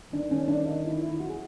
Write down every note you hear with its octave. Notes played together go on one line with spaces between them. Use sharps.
D#3 D4
C#4
D4
D#4
E4
E4
F#4
G#4